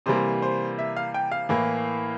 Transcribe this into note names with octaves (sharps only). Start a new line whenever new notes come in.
C3 E3 G3 A#3 C5
C5
E5
F5
G5
F5
A2 E3 A#3